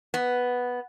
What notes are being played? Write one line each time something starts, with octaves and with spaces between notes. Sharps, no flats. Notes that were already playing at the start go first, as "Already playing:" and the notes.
B3